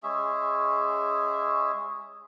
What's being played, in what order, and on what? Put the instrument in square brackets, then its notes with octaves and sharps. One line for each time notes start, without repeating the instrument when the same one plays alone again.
[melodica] G#3 C#4 G#4 E5